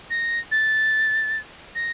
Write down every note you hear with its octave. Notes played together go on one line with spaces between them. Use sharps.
A#6
A6
A#6